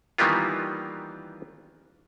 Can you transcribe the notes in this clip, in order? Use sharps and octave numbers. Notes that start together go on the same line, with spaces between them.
D#3 E3 G3 A#3 B3 F4